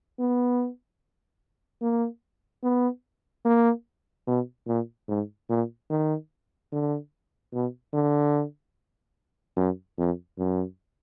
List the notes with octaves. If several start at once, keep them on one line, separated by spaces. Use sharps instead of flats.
B3
A#3
B3
A#3
B2
A#2
G#2
A#2
D#3
D3
B2
D3
F#2
F2
F#2